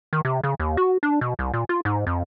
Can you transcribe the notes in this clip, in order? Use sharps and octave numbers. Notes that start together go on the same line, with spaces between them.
D#3
C3
C#3
D#2
F#4
D4
B2
C2
A#2
F4
G#2
F2